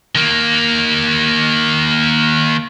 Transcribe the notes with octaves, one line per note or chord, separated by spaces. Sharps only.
D#3 A#3